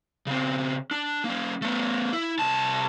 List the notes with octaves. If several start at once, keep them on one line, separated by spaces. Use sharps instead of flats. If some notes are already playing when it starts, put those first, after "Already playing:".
C#3 C4
D4
A#3 C#4
A3 B3
E4
C2 A5